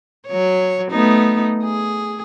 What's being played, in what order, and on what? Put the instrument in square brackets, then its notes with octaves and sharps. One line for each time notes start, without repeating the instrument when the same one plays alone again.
[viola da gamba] F#3 C#5
A3 B3 D#4
G#4